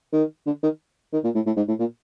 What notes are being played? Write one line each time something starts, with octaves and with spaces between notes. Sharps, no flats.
D#3
D3
D#3
D#3
A#2
A2
A2
G#2
A2
A#2